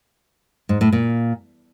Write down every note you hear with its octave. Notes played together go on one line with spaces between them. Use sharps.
G#2
A2
A#2